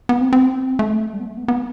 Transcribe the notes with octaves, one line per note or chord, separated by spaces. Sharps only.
B3
C4
C4
A3
G3
B3
A3
B3
B3